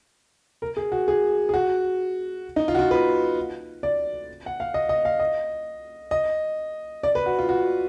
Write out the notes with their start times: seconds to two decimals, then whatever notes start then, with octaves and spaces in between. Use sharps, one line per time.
0.62 A#4
0.77 G#4
0.92 F#4
1.08 G#4
1.49 G#4
1.54 F#4
2.56 D#4
2.68 F4
2.75 F#4
2.79 F4
2.91 B4
3.83 D5
4.46 F#5
4.60 F5
4.74 D#5
4.89 D#5
5.05 F5
5.20 D#5
6.11 D#5
7.03 D5
7.15 B4
7.26 F#4
7.38 F4
7.49 F#4